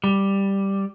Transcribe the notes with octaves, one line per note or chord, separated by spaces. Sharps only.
G3